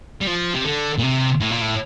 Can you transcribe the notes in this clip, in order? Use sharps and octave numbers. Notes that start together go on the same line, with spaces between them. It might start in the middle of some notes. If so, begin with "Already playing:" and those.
G3
F3
C3
D3
A#2
C3
A2
A#2
A2